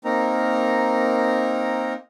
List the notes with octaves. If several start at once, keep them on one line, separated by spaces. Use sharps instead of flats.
A#3 C4 D#4 A#4 A#5